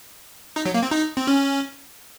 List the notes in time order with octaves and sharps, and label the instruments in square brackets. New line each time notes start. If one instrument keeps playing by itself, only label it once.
[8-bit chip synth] D#4
F#3
A#3
C4
D#4
C4
C#4